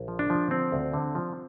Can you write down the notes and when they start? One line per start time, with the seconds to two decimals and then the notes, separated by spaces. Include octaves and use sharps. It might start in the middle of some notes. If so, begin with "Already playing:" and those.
Already playing: A#1
0.08 F3
0.19 D4
0.30 F3
0.51 D3 C4
0.72 D2
0.94 D3
1.15 F3